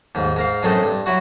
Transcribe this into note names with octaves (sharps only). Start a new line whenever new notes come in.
D#2 G#2
G#2 A#4 F5
F#2 A2 G#3 A3 C4 D#4
G2
F#3 E4 F#4